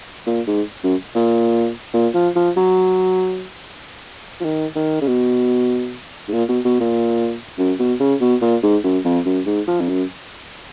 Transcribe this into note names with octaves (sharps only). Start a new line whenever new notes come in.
A#2
G#2
F#2
A#2
A#2
F3
F3
F#3
F3
D#3
D#3
C#3
B2
G#2
A#2
B2
B2
A#2
F#2
B2
C#3
B2
A#2
G#2
F#2
F2
F#2
G#2
F3
F2
F#2